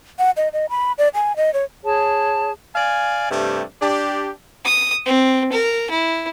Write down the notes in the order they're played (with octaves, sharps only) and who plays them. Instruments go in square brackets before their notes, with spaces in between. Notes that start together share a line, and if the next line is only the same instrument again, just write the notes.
[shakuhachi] F#5
D#5
D#5
B5
D5
G#5
D#5
C#5
[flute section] G#4 C#5 A5
[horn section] D5 F5 G#5
G2 C3 G3 A3
D4 G4
[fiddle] D#6
C4
A#4
E4